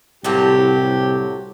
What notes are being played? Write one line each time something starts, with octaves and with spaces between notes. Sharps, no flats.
C2 A2 C3 F#3 G4